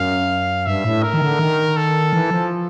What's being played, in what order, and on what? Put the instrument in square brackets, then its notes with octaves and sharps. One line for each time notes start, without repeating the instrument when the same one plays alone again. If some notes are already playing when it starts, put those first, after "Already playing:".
Already playing: [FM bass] F#2 [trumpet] F5
[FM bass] G2 [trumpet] E5
[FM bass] A2
[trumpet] A#4
[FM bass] D#3
D3
D#3
[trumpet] A4
[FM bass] E3
F3